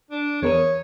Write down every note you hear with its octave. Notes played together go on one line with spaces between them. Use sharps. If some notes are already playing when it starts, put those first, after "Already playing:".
D4
E2 A#4 C#5 D#6